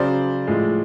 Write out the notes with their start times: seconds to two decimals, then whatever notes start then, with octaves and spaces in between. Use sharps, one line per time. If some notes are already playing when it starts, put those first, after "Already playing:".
Already playing: C#3 F#3 C5 D5
0.47 A2 F3 G#3